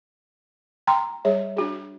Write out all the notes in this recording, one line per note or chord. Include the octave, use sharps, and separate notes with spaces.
G5 A#5 C6
G3 G#4 C#5 E5
D4 F#4 G#4